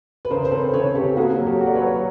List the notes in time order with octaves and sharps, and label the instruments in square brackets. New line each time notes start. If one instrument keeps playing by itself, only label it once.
[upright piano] B4
[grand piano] C#3 [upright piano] A#4 C5
[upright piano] C5
[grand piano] C4 [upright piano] A4 B4
[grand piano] C#3 [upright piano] B4 C#5
[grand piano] C#3 [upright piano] G4 A4
[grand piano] A#3 [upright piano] F#4 G#4
[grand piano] F#3
[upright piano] G4 A4
[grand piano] F#4
[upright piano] D5
B4 C#5
[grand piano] F#3
[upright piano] C#5